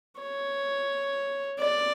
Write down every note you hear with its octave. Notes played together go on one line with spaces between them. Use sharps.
C#5
D5